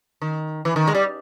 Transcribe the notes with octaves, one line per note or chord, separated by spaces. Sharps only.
D#3
E3
D#3
G#3
G3